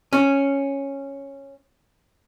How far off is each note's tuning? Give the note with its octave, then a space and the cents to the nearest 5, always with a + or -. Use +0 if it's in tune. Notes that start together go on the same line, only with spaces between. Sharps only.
C#4 -5